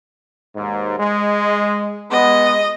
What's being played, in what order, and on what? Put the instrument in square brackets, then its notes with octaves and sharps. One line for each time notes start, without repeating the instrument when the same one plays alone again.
[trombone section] D#2 G#2
G#3
[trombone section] G#3 B3 [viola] D#5